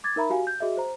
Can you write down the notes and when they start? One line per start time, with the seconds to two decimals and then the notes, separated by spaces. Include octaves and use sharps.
0.04 D6 G#6 A6
0.16 D#4 A#4 E5 A#5 B5
0.30 F#4 G4 F5 G#5
0.47 G6
0.60 F#4 G#4 D#5 E5
0.77 C5 A#5